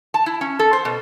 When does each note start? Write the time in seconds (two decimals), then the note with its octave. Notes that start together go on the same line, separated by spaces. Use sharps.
0.14 A5
0.26 E4
0.41 C#4
0.59 A4
0.73 C5
0.85 B2